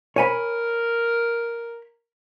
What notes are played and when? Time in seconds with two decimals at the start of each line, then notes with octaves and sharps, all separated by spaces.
0.16 A#4 C#5 G#5 B5